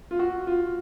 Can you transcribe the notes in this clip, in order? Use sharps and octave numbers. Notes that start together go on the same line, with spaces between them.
F4
F#4
F4